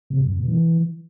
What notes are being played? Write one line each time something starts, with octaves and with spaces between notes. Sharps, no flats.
C3
F#2
F2
B2
E3